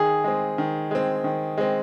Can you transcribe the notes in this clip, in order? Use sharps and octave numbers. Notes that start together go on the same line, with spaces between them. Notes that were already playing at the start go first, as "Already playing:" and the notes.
Already playing: D#3 G#4
G#3 C4
D#3
G#3 C4
D#3
G#3 C4